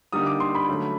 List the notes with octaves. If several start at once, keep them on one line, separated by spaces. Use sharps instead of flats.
D3 G3 A#3 D#4 D#6
D6
C6
B5
D3 F#3 A3 C#4